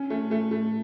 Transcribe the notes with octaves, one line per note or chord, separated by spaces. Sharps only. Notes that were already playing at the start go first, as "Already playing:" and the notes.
Already playing: C#4
A3
A3
A3